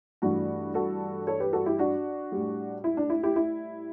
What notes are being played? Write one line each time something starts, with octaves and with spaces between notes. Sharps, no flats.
G2 E3 A3 D4 F#4
F#4 A4
A4 C#5
G4 B4
F#4 A4
E4 G4
D4 F#4
A2 G3
E4
D4
E4
E4 G4
E4